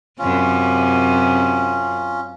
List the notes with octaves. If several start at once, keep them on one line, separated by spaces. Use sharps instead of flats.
F#2 C3 C#4 F4